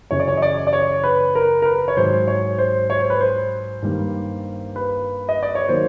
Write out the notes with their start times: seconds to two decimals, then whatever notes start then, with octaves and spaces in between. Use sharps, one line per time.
0.11 F#2 C#3 E3 C#5
0.20 D5
0.28 C#5
0.37 D#5
0.42 D5
0.67 D5
0.73 C#5
1.04 B4
1.35 A#4
1.62 A#4
1.65 B4
1.88 C#5
1.96 G#2 D#3 F#3 C5
2.28 C#5
2.59 C5
2.90 C#5
3.00 C5
3.10 B4
3.21 C5
3.82 G2 D#3 G3 A#3
4.76 B4
5.29 D#5
5.43 D5
5.55 C#5
5.68 D#3 F#3 A#3 C5